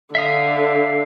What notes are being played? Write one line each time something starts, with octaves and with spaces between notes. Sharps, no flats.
D3 E5 F5 D#6